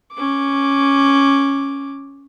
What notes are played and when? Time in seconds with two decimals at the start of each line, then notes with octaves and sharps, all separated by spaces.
0.14 C#4 D6